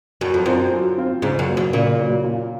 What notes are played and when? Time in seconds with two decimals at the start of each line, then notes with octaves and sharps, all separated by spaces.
0.21 F#2 F#3
0.34 F2
0.46 F#2 C4 F4 C5
0.72 F#3
0.97 C4 F4 C5
1.22 G#2 C#3
1.39 F#2
1.48 F#3 A#3
1.57 F#2
1.73 A#2 C#3
1.99 F#3 A#3
2.24 A#2